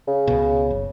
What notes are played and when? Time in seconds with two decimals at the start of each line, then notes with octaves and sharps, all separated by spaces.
0.08 C#3
0.27 C#2 B2
0.71 F#1